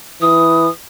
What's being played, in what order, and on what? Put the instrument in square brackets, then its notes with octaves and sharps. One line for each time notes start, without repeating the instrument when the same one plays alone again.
[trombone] E3 [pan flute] D#6